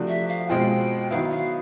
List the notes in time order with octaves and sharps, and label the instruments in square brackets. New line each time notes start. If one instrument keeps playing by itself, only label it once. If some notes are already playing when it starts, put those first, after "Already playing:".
Already playing: [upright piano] C3 F3 A3 D4 F#4
[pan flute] E5
F5
[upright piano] B2 G#3 C4 F4 G#4 [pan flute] G5
[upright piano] D#3 F#3 B3 E4 [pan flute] F5
[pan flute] F5